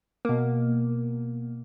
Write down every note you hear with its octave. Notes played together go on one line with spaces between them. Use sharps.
B2 A#3